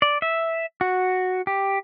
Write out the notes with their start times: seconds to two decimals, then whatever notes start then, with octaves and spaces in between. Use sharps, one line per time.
0.02 D5
0.22 E5
0.81 F#4
1.47 G4